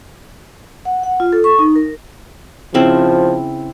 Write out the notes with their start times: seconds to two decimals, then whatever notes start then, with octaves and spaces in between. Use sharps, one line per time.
0.85 F#5
1.03 F#5
1.20 F4
1.33 A4
1.44 C#6
1.59 D#4
1.76 A#4
2.74 C#3 F3 C4 E4